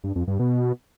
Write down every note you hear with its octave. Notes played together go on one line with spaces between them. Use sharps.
G2
F2
G2
B2